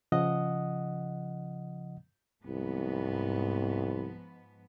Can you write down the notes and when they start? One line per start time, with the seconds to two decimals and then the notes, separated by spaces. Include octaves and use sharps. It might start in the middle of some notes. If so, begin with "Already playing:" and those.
0.12 C#3 F3 D#5 F#5 D#6
2.46 C2 G#2 F3 B3